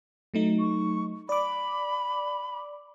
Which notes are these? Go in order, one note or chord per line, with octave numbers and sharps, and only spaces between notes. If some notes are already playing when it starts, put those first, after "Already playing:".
F#3 A3 D#4
C#6
D5 B5 D6